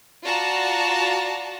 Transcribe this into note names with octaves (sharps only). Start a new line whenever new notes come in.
F4 F#4 D5 A5 A#5